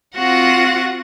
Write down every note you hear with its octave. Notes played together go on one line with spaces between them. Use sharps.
C4 F4 F#4 F#5 A#6